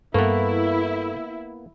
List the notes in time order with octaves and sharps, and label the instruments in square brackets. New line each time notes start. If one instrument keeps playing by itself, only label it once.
[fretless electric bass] G2 [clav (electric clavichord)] A#3 B3 [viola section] E4 [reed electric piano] A4 B4 C#6